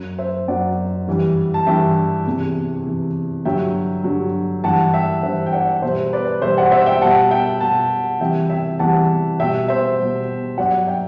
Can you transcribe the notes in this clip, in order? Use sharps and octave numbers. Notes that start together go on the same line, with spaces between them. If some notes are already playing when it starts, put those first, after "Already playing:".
Already playing: F#2 F#3
C5 E5
F#2 F#3 D5 F#5
G2 E3 G3
A5
G2 E3 G3 E5 G5
E2 C3 E3
E2 C3 E3
G2 D3 F#3 E5 G5
G2 D3 F#3
G2 E3 G3 F#5 A5
E5 G5
G2 E3 G3 C5 E5
G5
D5 F#5
E2 B2 G3 C5 E5
B4 D5
E2 B2 G3 C5 E5
D5 F#5
C5 E5
E5 G5
B2 G3 F#5 A5
E5 G5
B2 G3 F#5 A5
E2 C3 E3 G3 E5 G5
E5 G5
E2 C3 E3 G3 F#5 A5
B2 G3 E5 G5
C5 E5
B2 G3
G2 F#3 D5 F#5
E5 G5